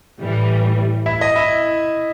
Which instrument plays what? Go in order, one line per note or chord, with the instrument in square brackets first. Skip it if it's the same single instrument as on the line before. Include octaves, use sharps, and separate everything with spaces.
[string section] A2 E3 G3
[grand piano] E4 E5
D#5
E4 E5